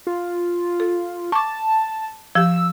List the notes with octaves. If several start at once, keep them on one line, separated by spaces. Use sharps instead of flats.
F4
A4
A5 C#6 D6
F3 G4 E6